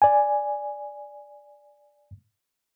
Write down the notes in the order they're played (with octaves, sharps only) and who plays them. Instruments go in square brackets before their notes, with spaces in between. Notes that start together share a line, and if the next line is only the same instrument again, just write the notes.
[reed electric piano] D5 G#5